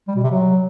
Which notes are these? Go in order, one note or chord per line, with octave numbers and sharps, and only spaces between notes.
G3
B2
C3
F#3